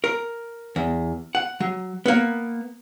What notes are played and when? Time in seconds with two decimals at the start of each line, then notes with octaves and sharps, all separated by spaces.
0.04 A#4
0.76 E2
1.35 F#5
1.60 F#3
2.06 A#3 B3